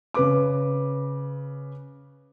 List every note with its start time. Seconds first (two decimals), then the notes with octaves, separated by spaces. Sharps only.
0.14 C#3 B4 D6